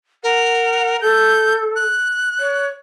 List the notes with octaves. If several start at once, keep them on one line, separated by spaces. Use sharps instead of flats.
A#4 F#5
A4 G6
F#6
C#5